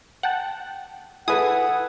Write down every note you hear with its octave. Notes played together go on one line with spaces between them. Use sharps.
F#5 G5 A5
E4 G#4 A4 B4 F#5 D#6